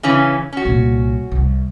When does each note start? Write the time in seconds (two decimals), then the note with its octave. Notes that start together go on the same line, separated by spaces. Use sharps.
0.03 C#3 E3 C#4
0.53 C#4 F#4
0.65 C2 A#2
1.31 C2